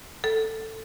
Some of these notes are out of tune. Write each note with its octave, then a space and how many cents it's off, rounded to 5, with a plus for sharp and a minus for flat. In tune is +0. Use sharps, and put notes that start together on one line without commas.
A4 +10